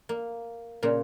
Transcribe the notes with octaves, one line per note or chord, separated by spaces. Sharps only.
A#3
A#2 C#3 A#3